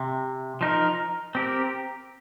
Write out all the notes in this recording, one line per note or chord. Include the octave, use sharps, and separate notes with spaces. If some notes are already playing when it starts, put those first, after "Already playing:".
Already playing: C3
F3 D#4 A#4
C4 G4 A#4